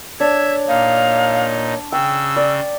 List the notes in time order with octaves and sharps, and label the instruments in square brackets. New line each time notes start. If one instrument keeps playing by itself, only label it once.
[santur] D4 [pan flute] C#5 [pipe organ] E5 [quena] G#6
[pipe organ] A#2 D#4 [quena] F5
[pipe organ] C#3 [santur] G5 [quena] E6
[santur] D5